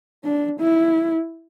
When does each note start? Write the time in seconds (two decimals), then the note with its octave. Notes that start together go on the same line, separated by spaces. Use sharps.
0.25 D4
0.60 E4